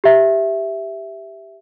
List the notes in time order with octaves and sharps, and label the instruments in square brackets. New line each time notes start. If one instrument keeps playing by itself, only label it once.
[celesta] G4 E5